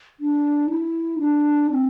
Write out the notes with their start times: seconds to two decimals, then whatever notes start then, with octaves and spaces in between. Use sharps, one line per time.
0.20 D4
0.69 E4
1.19 D4
1.71 C4